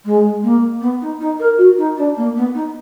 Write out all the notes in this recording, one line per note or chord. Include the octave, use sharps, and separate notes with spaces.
G#3
A#3
B3
D#4
D#4
A#4
F#4
D#4
D4
A#3
B3
D#4